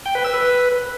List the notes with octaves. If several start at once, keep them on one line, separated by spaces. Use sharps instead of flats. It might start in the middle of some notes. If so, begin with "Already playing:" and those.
G5
B4
E6
B4